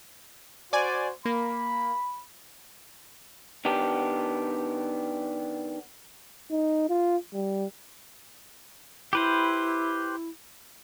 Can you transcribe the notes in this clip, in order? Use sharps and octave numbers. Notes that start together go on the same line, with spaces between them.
F#4 C5 D5 G#5
A#3 B5
D#3 B3 D4 G4
D#4
F4
G3
E4 G4 B4 C5